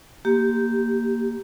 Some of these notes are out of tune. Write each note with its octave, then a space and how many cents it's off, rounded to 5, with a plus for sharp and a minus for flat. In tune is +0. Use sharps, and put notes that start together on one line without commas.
A#3 +0 G4 -5